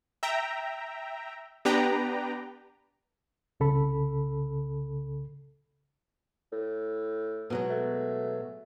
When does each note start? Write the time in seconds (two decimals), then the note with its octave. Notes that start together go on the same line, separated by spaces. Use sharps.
0.23 E5 G5 A#5
1.65 B3 D4 G4 B4 G5 A#5
3.60 C2 C#3 A4 B5
6.53 A2
7.50 B2 F#3 G#3
7.71 A3